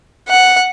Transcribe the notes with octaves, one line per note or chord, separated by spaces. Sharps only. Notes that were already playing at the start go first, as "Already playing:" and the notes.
F#5